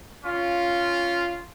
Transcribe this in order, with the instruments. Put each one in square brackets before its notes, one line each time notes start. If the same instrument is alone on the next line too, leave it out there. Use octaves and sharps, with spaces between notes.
[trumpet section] C#4 F4